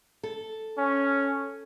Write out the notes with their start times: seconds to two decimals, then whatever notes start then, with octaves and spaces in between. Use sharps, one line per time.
0.23 A4
0.78 C#4